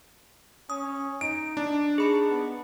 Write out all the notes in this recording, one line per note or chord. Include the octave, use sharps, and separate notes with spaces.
C#4 D#6
D#4 D7
D4 D5
D#4 G#4 B5 C#7
B3